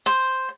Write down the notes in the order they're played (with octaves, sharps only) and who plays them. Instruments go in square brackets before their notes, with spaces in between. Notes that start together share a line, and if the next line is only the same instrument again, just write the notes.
[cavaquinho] C5